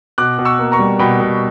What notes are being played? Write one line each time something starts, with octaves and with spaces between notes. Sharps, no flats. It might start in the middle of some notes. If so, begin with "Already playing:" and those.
B2 D6 F#6
B2
C#6 E6
A#3
A#5 C#6
G3
B2 G5 B5
B2